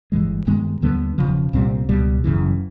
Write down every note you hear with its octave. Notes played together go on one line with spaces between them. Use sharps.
G1 G2 E3 G#3
G2 D#3 G#3 B3
D#2 D3 G3 B3
E1 E2 C#3 F3
C2 A#2 G3 C4
C#2 B2 G3
G1 F#2 C#3 E3